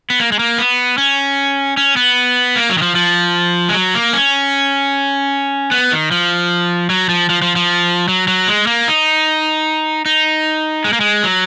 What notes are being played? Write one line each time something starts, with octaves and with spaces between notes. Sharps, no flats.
B3
A#3
G#3
A#3
B3
C#4
C#4
B3
A#3
F#3
D#3
F3
F3
G#3
F#3
A#3
C#4
B3
D#3
F3
F#3
F3
F3
F3
F3
F#3
F#3
G#3
A#3
D#4
D#4
G#3
A#3
G#3
F#3